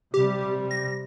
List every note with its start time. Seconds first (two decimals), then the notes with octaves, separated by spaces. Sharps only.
0.14 C3 G3 G4
0.71 A#6